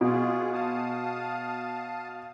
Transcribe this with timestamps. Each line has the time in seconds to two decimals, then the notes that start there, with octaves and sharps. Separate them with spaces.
0.01 B2 F4 G#4
0.53 F5 A5 D#6